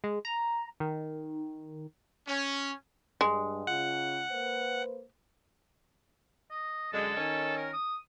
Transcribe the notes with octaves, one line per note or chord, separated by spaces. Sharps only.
G#3
A#5
D#3
C#4
G2 G#3
C#3 F4 F#5
A#3 B4 C5
D#5
F#2 D3 G#3 A4
D#3 C#4
A#4
D#6